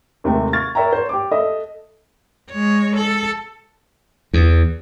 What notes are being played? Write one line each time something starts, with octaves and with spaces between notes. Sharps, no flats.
D#2 C3 G#3 A3 A4 G5
C#6 F6 G#6 A6
A#4 C#5 E5 G5 A#5
C5 C#5
G4 D6
A4 D#5 E5
G#3 C#5
A4
E2